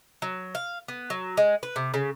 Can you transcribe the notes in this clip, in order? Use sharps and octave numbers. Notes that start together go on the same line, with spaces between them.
F#3
F5
B3
F#3
G#3
B4
C3
C#3